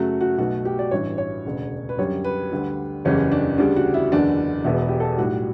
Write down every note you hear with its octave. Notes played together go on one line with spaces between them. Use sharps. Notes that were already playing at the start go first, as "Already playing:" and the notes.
Already playing: F#2 C#3 F#3 A3 F#4
F#4
B1 B2 A3 F#4
G4
D5
A1 G2 E3 C#5
C#5
E1 D2 C#3
B4
F#2 D3 G3 C#5
B4
D2 D3 G3
F#1 E2 C#3 E3 G3 C#4
D4
D2 C#3 G3 D4
F#4
E4
F#1 E2 D3 D4
E1 E2 B2 E4
G4
A4
B1 A2 G3 F#4